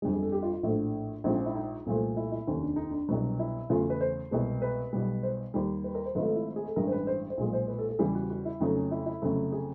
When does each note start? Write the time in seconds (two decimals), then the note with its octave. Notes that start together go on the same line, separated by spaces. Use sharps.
0.02 G1 F2 D3 G3 G#4
0.12 G#4
0.22 A4
0.32 G4
0.42 F4
0.53 F4
0.63 A#1 A2 F3 A3 D4
1.24 A#1 G#2 F3 G#3 C4
1.35 C#4
1.46 E4
1.55 D#4
1.86 C2 A#2 F3 A3
2.17 E4
2.32 E4
2.47 F1 D#2 D#3 C#4
2.63 D4
2.76 D#4
2.90 D4
3.09 C2 B2 F#3
3.39 E4
3.70 E2 C#3 E3 A3 F4
3.81 F#4
3.90 B4
4.01 C5
4.31 C2 B2 G#3
4.62 B4
4.93 B1 B2 G3
5.23 C5
5.54 D#2 D#3 G3
5.84 B4
5.95 A#4
6.05 C5
6.15 G#1 G#2 F3 A3 B4
6.25 A4
6.36 E4
6.56 G#4
6.66 A4
6.76 A1 G2 E3 G#3 A#4
6.87 C5
6.92 B4
7.07 C5
7.30 C5
7.37 B1 A#2 F3 G#3
7.53 C5
7.68 B4
7.79 A4
7.89 A4
7.99 E2 C#3 E3 G3 G4
8.15 F#4
8.30 F#4
8.45 E4
8.60 F2 C#3 F#3 A3 D#4
8.76 C#4
8.91 E4
9.06 E4
9.22 F1 F2 C#3 F#3 A3
9.52 G#4